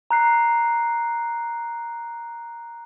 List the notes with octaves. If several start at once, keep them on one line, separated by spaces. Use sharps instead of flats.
A#5 F#6 C7